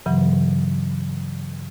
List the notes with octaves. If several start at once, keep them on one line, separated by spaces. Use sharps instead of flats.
G2 C#3 E3 F#3